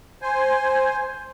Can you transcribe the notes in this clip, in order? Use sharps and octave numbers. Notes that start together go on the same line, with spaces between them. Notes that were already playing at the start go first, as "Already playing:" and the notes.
C5 G#5